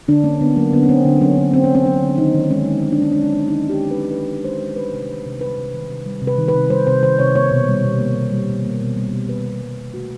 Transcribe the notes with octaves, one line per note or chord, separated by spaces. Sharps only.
D3 D4
A#3 C#4
D3 B3
F#3 A#3
D3 B3
C#4
A#3 C4
D3
F#3 C#4
D3
A#3 C4
C#4
D3 C4
F#3 C#4
D3
D#3 D#4
D#3
G#3 C#4
G#3
D#3 C#4
D4
D#3 C#4
G#3 D4
C#4
G#3
D#3 D#4
D#3
G4
G#3
B4
G#3
D#3 B4
D#3
G#3 C5
G#3
G3 B4
C3
D#3
C3
G3 B4
C3
D#3
C3
G3
C3
B4
D#3
B4
C3
G3 C5
C3 C5
D#3 C5
C3 C#5
A#3 C#5
B2
G3
B2
A#3
B2
G3
B2
A#3
B2
G3
B2
A#3 B4
B2
G3
B2
A3 F#4